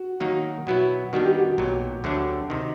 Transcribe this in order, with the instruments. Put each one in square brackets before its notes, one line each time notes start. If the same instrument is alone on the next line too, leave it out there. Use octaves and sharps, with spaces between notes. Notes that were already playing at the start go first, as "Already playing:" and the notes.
Already playing: [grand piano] F#4
[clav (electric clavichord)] D#3 F#3 A#3 D#4 [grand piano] F#4
[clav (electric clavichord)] B2 F#3 B3 E4 [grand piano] F#4
[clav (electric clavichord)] D#3 G3 B3 D4 [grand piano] F#4
[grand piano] G4
F#4
[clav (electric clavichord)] B1 A#2 F#3
D2 D3 F#3 A3 D4
C3 D#3